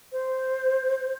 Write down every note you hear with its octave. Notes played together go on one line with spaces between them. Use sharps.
C5